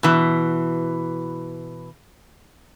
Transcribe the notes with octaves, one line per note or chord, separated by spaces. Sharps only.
B2 E3